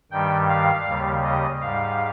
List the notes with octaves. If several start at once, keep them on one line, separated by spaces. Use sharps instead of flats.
G2 D#3 G3 G5
F5
D#2 C#3 G3
D#5
G#2 G3 F5